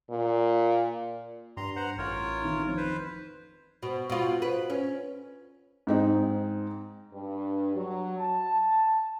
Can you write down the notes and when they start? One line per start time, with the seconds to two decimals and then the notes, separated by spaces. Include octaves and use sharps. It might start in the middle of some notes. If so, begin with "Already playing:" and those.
0.10 A#2
1.57 G2 A#5 C6
1.76 B4 C5 F#5 A#5
1.98 A1 F4 A#4 C#5
2.42 D#3 E4
2.63 F2 D#3
2.77 B4 C5
3.83 B2
4.10 B2 F4
4.42 B4
4.70 C#4
5.87 G#2 C4 D#4
7.12 G2
7.76 F#3
8.18 A5